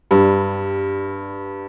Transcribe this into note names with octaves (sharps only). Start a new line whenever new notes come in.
G2 G3